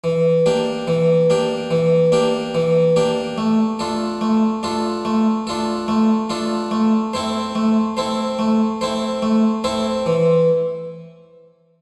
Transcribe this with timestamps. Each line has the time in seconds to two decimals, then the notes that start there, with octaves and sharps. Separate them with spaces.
0.04 E3
0.46 A#3 D4 G4
0.88 E3
1.30 A#3 D4 G4
1.71 E3
2.12 A#3 D4 G4
2.55 E3
2.96 A#3 D4 G4
3.38 A3
3.79 D4 F4 A4
4.21 A3
4.63 D4 F4 A4
5.05 A3
5.47 D4 F4 A4
5.88 A3
6.30 D4 F4 A4
6.71 A3
7.13 C4 E4 A4 C5
7.55 A3
7.97 C4 E4 A4 C5
8.39 A3
8.81 C4 E4 A4 C5
9.22 A3
9.64 C4 E4 A4 C5
10.06 E3